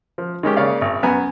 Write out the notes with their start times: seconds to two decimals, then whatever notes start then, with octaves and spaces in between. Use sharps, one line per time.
0.18 F3
0.43 D#3 G#3 C#4 G4
0.56 C#3 A#3 C#5 D5 F5
0.81 G#1
1.03 F#2 B3 G#5 A#5